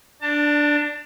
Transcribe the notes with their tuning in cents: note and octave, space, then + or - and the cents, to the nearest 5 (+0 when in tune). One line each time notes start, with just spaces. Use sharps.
D4 +0 A5 +25